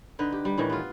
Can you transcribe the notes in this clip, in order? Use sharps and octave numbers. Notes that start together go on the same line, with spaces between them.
D3 D#4 B4
G4
G3
A2 D#3 E3
B3 F4